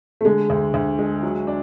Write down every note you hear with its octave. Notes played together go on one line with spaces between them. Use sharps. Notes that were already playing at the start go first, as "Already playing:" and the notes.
A3
D3 G#3
D2
D2
G#3
F#3
D4